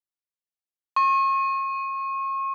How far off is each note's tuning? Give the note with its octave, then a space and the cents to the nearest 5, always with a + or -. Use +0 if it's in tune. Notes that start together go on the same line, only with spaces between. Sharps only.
C#6 -40